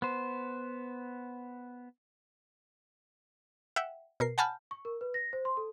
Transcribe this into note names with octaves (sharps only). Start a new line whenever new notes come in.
B3 C5
E5 F#5 G5
B2 A#4 C7
F#5 G#5 A5 B5 F6 G6
C#6
A#4
B4
A#6
C5
C6
A4